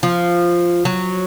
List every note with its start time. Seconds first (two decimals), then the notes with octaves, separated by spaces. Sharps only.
0.03 F3
0.85 F#3